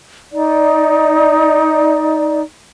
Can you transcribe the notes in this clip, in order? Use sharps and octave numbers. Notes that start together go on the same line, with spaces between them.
D#4 D5